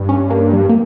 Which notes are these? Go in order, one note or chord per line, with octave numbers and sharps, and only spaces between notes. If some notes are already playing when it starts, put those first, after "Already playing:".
Already playing: G2
C#4
A#3
G3
A#3